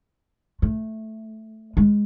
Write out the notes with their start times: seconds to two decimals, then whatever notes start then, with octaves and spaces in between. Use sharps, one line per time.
0.62 A3
1.77 G#3